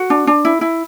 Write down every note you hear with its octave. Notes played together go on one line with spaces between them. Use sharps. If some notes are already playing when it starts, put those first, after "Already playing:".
Already playing: F#4
D4
D4
E4
E4